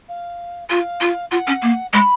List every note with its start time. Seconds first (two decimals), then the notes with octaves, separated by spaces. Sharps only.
0.09 F5
0.70 F4 F5
1.01 F4
1.31 F4 F#5
1.47 C#4
1.62 A#3
1.93 G#3 B5